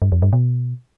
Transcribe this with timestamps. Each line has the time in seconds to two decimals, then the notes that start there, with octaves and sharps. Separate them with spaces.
0.02 G2
0.12 F2
0.22 G2
0.33 B2